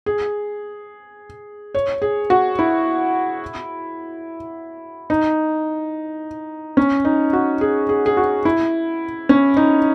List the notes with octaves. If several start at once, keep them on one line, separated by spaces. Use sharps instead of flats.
G#4
C#5
G#4
F#4
E4
D#4
C#4
D#4
F#4
G#4
G#4
G#4
F#4
E4
C#4
D#4